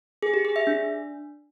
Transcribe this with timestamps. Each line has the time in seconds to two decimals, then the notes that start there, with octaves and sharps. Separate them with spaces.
0.23 G#4
0.34 G4
0.45 G#4
0.56 E5
0.67 D4